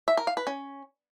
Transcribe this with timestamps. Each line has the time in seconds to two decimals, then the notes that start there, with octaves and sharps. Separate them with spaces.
0.08 E5
0.17 A#4
0.27 F5
0.37 B4
0.47 C#4